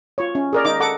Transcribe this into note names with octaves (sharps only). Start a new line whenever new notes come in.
F4 C#5
C#4
G#4 A#4 D5
D#4 D6
A4 F#5 D6